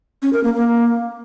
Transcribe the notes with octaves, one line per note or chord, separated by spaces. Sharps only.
C#4
A#4
A#3
A#3